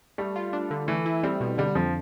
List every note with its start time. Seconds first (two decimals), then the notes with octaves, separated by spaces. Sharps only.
0.18 G3 A3
0.36 F4
0.53 D4
0.71 D3
0.88 E3 A3
1.06 E4
1.23 G3 C4
1.41 B2
1.58 D3 G3
1.75 F2 F3